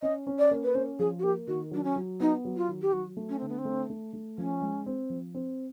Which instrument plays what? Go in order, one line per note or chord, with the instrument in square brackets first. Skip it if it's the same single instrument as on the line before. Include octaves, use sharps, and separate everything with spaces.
[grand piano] C#4 [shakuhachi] D#5
[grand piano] C#4
[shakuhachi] D5
[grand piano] A#3
[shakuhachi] B4
[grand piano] C#4 [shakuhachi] C5
[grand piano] F3 [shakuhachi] G#4
[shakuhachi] F#4
[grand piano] A#3 [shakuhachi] G4
[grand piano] D#3 [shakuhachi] F#4
[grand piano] F#3 [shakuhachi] D4
[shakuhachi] C#4
[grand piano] F#3
[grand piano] B3 [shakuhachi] D#4
[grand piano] F#3
[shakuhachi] F4
[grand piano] D#3
[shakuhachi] G4
[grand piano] F#3 [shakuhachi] F#4
[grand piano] A3
[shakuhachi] C#4
[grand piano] D3 [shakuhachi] C4
[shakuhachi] B3
C4
[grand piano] A3
A3
A3
[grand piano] F3 [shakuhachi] C#4
[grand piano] G#3
C4
F3
C4